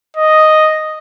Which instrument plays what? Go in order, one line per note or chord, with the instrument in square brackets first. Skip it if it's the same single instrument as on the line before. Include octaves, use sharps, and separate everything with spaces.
[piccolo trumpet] D#5